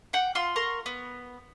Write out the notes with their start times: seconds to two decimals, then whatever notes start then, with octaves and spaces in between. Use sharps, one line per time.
0.13 F#5 G5
0.35 F4 C6
0.56 A#4 C6 C#6
0.86 B3